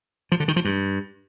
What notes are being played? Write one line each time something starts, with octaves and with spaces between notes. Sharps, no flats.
F3
D3
D#3
F3
G2